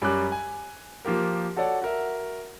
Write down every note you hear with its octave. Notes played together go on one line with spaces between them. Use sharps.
F#2 G3 C#4 D6 F#6
G#5
F3 A#3 F4 G4 A#4
F#4 A4 C#5 D5 F#5
F#4 A#4 E5